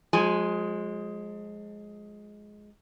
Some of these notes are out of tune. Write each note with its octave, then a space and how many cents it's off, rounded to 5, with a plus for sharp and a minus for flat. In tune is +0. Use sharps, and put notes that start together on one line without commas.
F3 +45 G#3 +10 G#5 +0